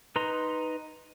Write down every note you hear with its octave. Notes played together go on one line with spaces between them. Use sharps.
D#4 B4 A#5 C6